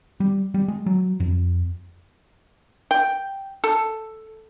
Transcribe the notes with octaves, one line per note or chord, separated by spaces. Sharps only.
G3
G3
G#3
F#3
F2
G5
A4